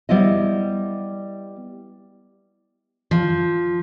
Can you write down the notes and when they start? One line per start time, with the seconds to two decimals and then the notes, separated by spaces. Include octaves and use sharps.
0.09 G3 B3 E4 D#5
3.11 F3